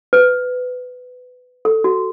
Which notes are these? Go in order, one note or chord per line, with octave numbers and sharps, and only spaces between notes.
B4
A4
F#4